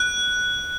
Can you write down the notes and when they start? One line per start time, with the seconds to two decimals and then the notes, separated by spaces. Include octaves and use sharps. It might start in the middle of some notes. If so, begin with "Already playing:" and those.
Already playing: F#6